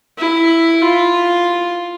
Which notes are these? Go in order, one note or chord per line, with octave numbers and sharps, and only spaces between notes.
E4
F4